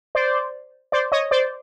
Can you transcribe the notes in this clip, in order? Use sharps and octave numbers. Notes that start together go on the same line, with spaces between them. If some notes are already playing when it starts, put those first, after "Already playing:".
C5 D5
C5 D5
C#5 D#5
C5 D5